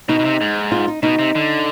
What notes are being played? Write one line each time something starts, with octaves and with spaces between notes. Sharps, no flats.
B2 D#4
B2
C3
G#2
F4
D#4
B2 D#4
C3
D3